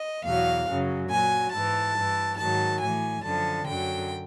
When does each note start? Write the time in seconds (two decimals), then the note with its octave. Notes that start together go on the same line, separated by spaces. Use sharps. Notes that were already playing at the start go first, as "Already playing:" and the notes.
Already playing: D#5
0.25 E2 B2 F#3 F5
0.67 F#2 C#3 F#3
1.10 A#2 F#3 G#5
1.53 G#2 E3 A5
1.96 G2 E3
2.39 G#2 D#3 F#3 A5
2.81 A2 E3 G#5
3.24 F#2 D3 F3 A5
3.67 F#2 D3 F#3 G5